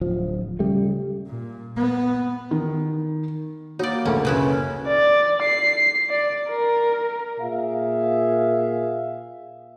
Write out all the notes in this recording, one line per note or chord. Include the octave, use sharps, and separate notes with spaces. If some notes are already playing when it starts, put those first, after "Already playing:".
D1 F3
C#3 G3 A3
A#2
B3
D#3
A#3 D#4 F#4 C#5 D5 F#5
F#1 D2 C#4
B2 B3 C#4 E4
D5
C7
D5
A#4
A#2 G#4 E5 F5